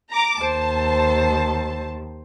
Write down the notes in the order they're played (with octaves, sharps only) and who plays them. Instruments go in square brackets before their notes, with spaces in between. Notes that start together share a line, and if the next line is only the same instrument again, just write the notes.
[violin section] A#5 D6
[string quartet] D#2 [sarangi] C5 [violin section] A5